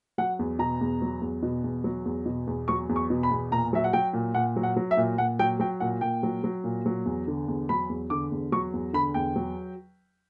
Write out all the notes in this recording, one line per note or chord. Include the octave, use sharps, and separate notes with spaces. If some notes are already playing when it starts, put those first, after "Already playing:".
F#3 F#5
E2
B2 A#5
E2
F#3
E2
B2
E2
F#3
E2
B2
E2
F#3 C#6
E2
C#6
B2
B5
E2
A#2 A#5
F#3 E5
F#5
F#3 G5
A#2
A#2 F#5
F#3
F#5
F#3
E5
A#2
A#2 F#5
F#3 G5
F#3 G5
A#2 F#5
A#2 G5
F#3
F#3
A#2
F#3
E2
D3
E2
F#3 B5
E2
D3 D6
E2
F#3 C#6
E2
D3 B5
E2 G5
F#3